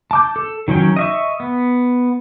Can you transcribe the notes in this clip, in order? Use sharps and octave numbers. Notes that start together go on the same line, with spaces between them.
A5 D6 G6
A4
D#3 F#3 C#4 G5
D#5 E5 C#6
B3